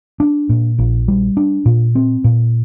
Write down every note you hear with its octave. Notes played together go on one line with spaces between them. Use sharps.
D4
A#2
A#1
G3
D4
A#2
C4
A#2